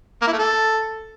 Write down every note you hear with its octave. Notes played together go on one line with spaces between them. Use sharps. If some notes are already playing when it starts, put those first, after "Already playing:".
A#3
E4
A3
A4